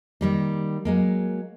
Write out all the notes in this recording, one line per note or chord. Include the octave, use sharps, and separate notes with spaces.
D#3 G3 A#3
F#3 G#3 A#3